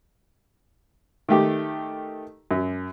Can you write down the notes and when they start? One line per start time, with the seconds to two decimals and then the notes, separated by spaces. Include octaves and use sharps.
1.29 D#3 A3 G4
2.51 F#2